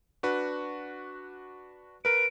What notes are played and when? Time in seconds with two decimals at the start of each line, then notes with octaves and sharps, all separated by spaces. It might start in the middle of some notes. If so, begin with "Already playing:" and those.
0.23 D4 F#4 B4
2.05 A#4 B4 D7